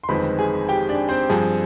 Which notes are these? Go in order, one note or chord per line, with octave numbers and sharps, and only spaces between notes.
C6
G1 F2 D#3 G#3 C4 B4 B5
G#4 G#5
G4 G5
D4 D5
C4 C5
G2 F3 C4 G#4